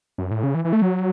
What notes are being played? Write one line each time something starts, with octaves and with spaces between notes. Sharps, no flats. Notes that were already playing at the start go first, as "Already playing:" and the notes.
F#2
A2
C#3
E3
E3
A3
F#3